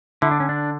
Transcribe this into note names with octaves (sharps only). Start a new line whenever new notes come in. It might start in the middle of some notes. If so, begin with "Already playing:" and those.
D3 E4
D4
C#4
D4